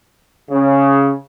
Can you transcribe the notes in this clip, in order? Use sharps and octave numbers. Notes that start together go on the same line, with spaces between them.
C#3